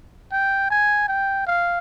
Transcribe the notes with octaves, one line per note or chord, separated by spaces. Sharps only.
G5
G#5
G5
F5